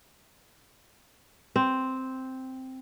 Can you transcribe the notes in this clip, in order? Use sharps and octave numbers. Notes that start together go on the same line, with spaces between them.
C4